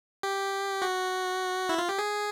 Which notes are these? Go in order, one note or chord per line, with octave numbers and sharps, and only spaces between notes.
G4
F#4
E4
F4
G4
G#4